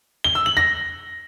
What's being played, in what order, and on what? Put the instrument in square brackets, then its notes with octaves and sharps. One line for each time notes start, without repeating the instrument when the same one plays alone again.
[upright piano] G7
E6
F#7
A#6